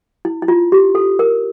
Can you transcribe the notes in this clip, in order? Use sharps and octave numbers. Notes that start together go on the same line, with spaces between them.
E4
E4
F4
G4
A4
A#4